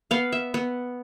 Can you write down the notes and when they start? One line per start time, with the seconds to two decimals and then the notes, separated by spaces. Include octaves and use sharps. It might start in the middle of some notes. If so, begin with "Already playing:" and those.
0.11 B3 F5
0.32 E5
0.54 B3